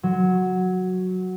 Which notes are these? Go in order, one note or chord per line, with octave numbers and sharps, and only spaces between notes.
F#3